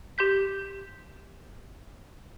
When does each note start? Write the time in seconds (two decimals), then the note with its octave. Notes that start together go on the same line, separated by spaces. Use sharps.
0.18 G4 C6 G6 B6